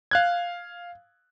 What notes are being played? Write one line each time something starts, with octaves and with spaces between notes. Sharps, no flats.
F5 F#6 G#6